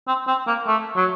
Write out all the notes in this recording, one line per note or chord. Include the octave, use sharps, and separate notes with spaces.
C4
C4
A#3
A3
F#3